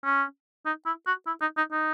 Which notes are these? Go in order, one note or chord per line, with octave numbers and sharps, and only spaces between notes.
C#4
D#4
E4
F#4
E4
D#4
D#4
D#4